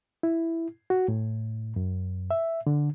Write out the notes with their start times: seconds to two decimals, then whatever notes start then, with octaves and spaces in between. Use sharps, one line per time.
0.23 E4
0.90 F#4
1.08 A2
1.76 F#2
2.31 E5
2.67 D3